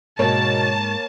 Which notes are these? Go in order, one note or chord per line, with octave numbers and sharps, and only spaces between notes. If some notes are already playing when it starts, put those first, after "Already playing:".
G#2 B2 A#3 C#5 A5